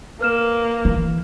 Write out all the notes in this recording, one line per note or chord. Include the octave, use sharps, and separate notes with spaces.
A#3 B4 F6 E7
E3